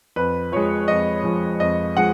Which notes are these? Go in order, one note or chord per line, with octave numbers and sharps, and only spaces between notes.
F2 B4
F3 G#3 C#5
F2 D#5
F3 G#3
F2 D#5
F3 G#3 F#5